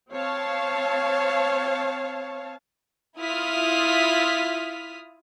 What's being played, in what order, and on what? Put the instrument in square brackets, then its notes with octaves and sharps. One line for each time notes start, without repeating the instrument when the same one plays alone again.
[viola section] C4 C#5 F5 A5
[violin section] E4 F4 D#6 F6 B6